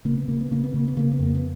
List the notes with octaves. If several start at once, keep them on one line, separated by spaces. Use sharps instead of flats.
C#3 A#3
B3
C#3 A#3
B3
C#3 A#3
B3
C#3 A#3
B3
C#3 A#3
B3
F2 A#3
B3